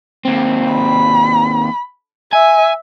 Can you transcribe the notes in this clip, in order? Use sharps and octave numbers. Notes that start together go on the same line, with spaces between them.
D#2 C4
B5
E5 G#5